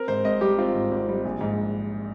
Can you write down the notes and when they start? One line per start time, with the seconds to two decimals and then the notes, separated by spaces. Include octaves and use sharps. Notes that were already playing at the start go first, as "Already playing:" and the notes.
Already playing: C4 A#4
0.08 G#2 C5
0.25 G#1 D#5
0.41 G3 G4
0.58 C4 F4
0.75 G#2
0.91 G#1
1.09 G3
1.25 A#1
1.41 G#2